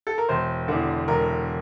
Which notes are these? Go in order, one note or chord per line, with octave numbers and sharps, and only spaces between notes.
A4
A#4
E1 C5
E2 D3
E1 A#4